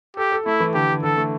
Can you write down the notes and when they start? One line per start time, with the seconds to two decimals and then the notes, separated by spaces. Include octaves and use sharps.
0.17 G4 A4
0.32 A4
0.46 A3 E4
0.60 E3
0.74 D3 G4
0.89 D3
1.03 D3 A4
1.17 A3